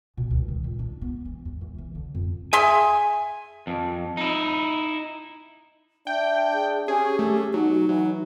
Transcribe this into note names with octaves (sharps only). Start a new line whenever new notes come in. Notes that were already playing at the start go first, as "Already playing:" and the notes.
B2
D2
D#3
A#2
D4
B3
E3
E2
E2
E3
D3
F2
G#4 E5 G#5 C6
F2
D#4 E4
D4 E5 G5
G#4
C#4 G4 G#4
A3
B2 F#3 D#4
E3 F#3